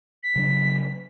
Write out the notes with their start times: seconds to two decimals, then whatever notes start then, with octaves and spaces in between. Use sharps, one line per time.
0.23 B6
0.36 C#3 F#3 D4